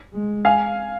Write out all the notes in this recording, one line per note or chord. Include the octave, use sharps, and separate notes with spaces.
G#3
F5 G#5